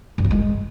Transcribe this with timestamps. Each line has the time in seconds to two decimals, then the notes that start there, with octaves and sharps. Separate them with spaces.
0.18 G2
0.24 F3
0.31 G#3